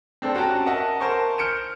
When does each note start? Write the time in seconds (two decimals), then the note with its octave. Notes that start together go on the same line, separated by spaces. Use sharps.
0.22 C4 D4 A4 C5
0.35 C#4 F#4 G4 G5 A5 A#5
0.66 A#4 D#5 E5 F#5 A5
1.00 A#4 C5 G#5 A5 C#6
1.38 F6 G6 C#7 D7 E7